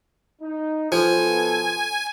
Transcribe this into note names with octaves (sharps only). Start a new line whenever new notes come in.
D#4
B2 F3 B3 A4 G#5